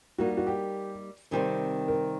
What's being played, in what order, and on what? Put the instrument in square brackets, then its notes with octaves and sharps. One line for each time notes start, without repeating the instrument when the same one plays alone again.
[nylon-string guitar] G3 A#3 D#4 [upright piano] F#4
[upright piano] F#4
G4
[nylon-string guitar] C3 D#3 G3 C4
[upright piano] A#4